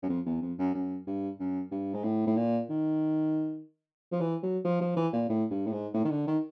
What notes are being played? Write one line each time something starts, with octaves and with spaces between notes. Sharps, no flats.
F#2
F2
E2
F2
F#2
F#2
G2
F#2
G2
G#2
A2
A2
A#2
D#3
F3
E3
F#3
F3
F3
E3
A#2
A2
G2
A2
G#2
A2
D#3
D3
D#3